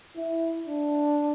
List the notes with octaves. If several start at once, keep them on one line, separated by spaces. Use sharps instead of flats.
E4
D4